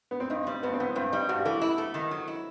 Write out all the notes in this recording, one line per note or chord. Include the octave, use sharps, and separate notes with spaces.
B3
C4
G2 D#4
G3 C4
G2 B3
C4
E3 B3
G2 C4
G3 D#4
G2 F#4
G4
E3 A4
E4
A3
D#3
F#3
E4